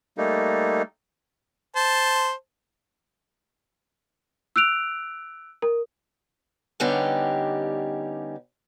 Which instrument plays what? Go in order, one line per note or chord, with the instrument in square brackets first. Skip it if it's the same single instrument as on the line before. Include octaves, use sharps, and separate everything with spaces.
[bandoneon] G3 A3 A#3 D#4
[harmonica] C5 A5
[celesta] E6 F#6 D7 F7
A#4
[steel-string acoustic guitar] D3 G3 B3 C#4 D#4 G4